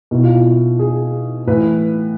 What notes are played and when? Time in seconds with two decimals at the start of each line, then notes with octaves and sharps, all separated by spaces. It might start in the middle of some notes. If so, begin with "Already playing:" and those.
0.11 B2 E4
0.23 F4
0.34 E4
0.79 G#4
1.47 A2 E3 B4